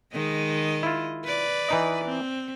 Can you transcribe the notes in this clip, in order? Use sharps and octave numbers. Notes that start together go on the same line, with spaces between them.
D#3 G#3 D#5
E4 F4
B4 D5
E3 D#4 D#5
C4